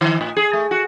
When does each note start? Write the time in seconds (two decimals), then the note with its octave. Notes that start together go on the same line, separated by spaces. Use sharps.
0.01 D#3
0.21 A2
0.37 G#4
0.53 A3
0.71 F#4